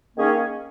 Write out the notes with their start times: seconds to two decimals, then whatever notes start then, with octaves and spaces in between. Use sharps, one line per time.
0.15 D#3 A#3 C#4 G#4